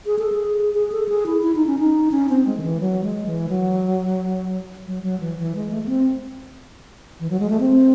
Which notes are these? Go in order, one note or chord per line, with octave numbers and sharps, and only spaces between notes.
G#4
A4
G#4
G#4
A4
G#4
E4
E4
D#4
C#4
D#4
C#4
C4
G#3
D#3
E3
F#3
G#3
E3
F#3
F#3
F#3
E3
E3
G#3
A3
A3
C4
E3
F#3
G#3
A3
C4